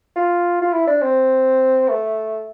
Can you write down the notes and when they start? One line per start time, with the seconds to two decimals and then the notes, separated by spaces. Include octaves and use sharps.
0.16 F4
0.62 F4
0.73 E4
0.87 D4
1.02 C4
1.89 A3